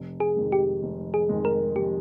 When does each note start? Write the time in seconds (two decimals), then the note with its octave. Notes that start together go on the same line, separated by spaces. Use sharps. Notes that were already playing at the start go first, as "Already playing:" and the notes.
Already playing: F1
0.20 G#4
0.36 F2 D#3 G#3
0.52 G4
0.83 F1
1.14 G#4
1.29 F2 D#3 G#3
1.45 A#4
1.75 F1 G4